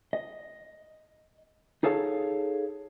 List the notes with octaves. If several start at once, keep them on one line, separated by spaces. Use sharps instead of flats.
D#5
D#4 G#4 A4 C#5 F5